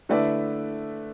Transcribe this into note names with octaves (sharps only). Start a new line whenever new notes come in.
D3 A3 E4 B4 D5